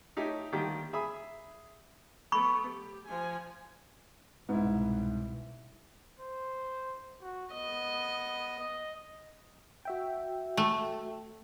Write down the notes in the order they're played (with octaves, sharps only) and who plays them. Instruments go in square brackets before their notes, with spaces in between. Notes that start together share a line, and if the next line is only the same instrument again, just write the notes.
[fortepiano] A3 D#4 G4 C#5 E5
D3 D#3 G3 A#3 G4
G#4 E5 B5 D#6
[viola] A3 B3 [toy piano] B5 C#6
[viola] G4
F3 G#5
[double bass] C2 B2 [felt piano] G#2 [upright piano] B3 E4
[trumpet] C5
F#4
[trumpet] B3 [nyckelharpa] D#5
[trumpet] D#5
[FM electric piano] F#4 E5 G5
[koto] A3